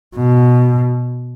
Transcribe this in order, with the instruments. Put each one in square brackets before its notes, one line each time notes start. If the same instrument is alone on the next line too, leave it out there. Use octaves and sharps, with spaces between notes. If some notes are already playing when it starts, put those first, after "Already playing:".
[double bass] B2